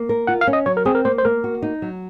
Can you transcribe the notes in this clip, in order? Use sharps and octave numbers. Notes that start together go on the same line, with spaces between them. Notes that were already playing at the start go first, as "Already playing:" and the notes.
Already playing: A#3
A#4
F4 F#5
F5
C#4
D#5
F#3 C#5
A#4
C4 G#4
A#4
A#3 C5
C5
A#3 A#4
F#4
D#4
F#3